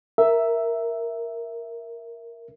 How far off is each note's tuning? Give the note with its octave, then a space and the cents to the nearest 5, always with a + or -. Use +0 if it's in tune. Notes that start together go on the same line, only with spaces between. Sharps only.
A#4 +0 E5 +0